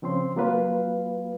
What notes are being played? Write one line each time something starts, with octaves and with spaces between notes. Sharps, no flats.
C#3 F3 C4 C#4 C6
F#3 A#3 F4 B4 F5